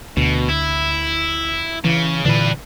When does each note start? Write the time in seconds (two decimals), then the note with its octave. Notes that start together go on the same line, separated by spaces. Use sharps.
0.17 D2 B2
0.49 E4
1.84 C#3 E3
2.25 A#2 D3 E3 D4 B4